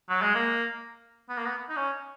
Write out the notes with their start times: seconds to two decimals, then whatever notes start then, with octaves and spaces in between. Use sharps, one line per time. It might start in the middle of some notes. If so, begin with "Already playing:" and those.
0.09 F#3
0.22 G#3
0.35 A#3
1.29 B3
1.37 A#3
1.46 B3
1.69 D#4
1.76 C#4